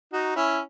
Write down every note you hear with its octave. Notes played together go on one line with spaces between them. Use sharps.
D#4 F#4
C#4 E4